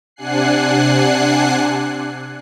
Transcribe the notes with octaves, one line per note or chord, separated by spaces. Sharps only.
C3 D4 F#5 G#5 F#6 C7